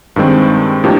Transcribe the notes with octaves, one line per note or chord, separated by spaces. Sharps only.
G2 D#3 G#3 C4
A2 F3 A#3 D4 G4